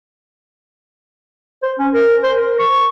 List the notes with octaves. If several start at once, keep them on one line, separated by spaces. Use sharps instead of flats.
C5
C#4
A#4
C5
A#4
C#6